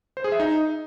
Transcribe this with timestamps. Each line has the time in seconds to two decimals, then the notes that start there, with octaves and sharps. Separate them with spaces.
0.17 C5
0.24 G#4
0.32 E5
0.40 D#4